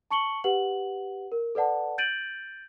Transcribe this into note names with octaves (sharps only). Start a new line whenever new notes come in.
A5 C#6 C#7 F#7 G7
G4 B4 F#5 F#7
A#4
A4 B4 D5 F#5 A5
G6 A6 D7 D#7 F#7